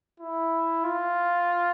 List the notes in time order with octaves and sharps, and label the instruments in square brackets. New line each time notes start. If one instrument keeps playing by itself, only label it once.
[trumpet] E4
F4